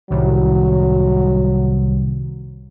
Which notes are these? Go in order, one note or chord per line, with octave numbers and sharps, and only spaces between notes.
C2 A2 C3 D#3 F#3